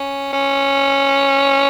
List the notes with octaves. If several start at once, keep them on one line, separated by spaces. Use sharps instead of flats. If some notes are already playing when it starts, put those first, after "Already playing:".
Already playing: C#4
C#4